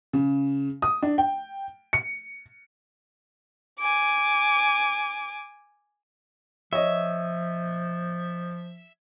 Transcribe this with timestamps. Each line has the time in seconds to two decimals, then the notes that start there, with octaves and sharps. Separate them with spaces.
0.13 C#3
0.82 D#6
1.03 D4
1.18 G5
1.93 C#7
3.79 G#5 D6
6.73 F3 C#5 D#5 E5